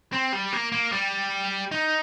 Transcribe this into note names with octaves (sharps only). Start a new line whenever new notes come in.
C4
G3
A#3
A#3
G3
D#4